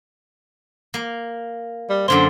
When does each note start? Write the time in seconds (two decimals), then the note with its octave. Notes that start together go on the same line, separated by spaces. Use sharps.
0.94 A#3
1.90 G3
2.08 F#2 D3 A#3 C5